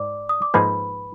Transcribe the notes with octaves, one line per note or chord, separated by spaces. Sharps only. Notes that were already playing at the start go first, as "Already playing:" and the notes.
Already playing: G#2 D5 D6
D#6
D6
G#2 F3 A#3 D#4 G#4 B4 B5